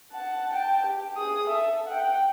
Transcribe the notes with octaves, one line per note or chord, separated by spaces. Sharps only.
F#5 A5
G5 A5
G4
G#4 D#6
A4 E5
F#5 G5